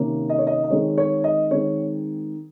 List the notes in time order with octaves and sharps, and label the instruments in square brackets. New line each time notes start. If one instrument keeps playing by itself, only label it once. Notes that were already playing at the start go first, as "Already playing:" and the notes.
Already playing: [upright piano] C3 D#3 A#3 C#4
D#5
C#5
D#5
D#5
D#3 G#3 C4 C#5
C#5
D#5
D#3 G#3 C4 C#5